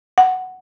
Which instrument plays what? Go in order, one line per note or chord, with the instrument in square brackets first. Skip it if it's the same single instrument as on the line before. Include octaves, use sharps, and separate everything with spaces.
[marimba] F#5